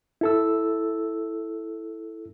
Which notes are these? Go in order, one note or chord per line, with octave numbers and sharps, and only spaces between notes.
E4 A4 E6